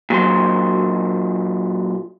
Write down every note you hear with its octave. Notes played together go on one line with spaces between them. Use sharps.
A#2 F#3 C5